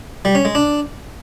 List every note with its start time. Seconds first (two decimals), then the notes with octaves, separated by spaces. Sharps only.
0.25 G3
0.35 C#4
0.45 G#3
0.55 D4